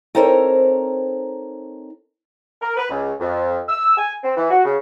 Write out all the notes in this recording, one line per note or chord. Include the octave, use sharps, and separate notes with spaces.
C4 D#4 A4 A#4 C5 C#5
A#4
B4
C#2
F2
E6
G#5
C4
E3
F#4
C#3